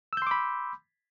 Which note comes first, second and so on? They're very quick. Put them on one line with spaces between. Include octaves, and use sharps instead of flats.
E6 G6 C6 D6 B5